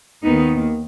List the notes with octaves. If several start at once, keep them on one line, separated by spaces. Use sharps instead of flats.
D#2 D#3 B3 D#4